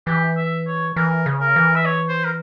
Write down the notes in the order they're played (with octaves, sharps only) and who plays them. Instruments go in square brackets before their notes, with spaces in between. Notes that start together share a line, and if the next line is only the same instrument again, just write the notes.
[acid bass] E3 [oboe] G4
[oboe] E5
C#5
[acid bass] E3 [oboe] A#4
[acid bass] C#3
[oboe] A#4
[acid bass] E3
[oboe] E5
C#5
C5
A#4